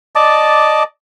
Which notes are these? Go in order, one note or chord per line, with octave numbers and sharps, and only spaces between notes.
D5 D#5 A5 D6